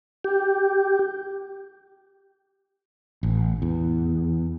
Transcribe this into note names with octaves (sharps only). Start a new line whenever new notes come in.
G4
A1
E2